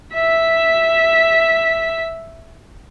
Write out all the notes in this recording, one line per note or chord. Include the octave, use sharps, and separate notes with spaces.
E5 B6